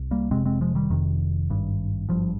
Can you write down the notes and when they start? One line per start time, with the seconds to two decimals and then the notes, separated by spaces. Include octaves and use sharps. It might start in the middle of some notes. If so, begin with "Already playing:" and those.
Already playing: C2
0.11 G3 A#3
0.31 F1 F2 C3 G#3 C4
0.45 G#3 C4
0.61 F3 G#3
0.75 D#3 G3
0.90 F1 F2 C3 D#3
1.50 G#1 G2
2.09 G#1 G2 F3